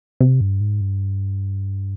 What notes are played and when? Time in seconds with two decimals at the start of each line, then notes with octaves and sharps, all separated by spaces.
0.20 C3
0.41 G2
0.61 G#2
0.81 G2